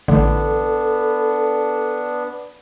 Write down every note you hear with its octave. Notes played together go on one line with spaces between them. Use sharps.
A1 D3 B3 D4 A4